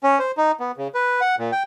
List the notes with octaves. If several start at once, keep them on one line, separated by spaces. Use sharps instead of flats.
C#4
C5
D#4
B3
C#3
B4
F#5
A#2
G5